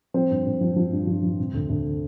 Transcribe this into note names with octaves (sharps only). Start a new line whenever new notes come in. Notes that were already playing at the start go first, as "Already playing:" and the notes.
F3 C4 C5
G2
G2
F3
F3
G2
F3
F3
C3
D2
D2